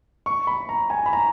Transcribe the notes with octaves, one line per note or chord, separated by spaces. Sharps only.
C#6
B5
A#5
G#5
B5
A#5